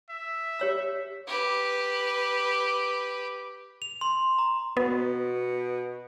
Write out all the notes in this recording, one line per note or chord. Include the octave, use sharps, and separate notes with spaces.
E5
G4 C#5 E6
G4 B4
F7
C6
A#5
B2 B3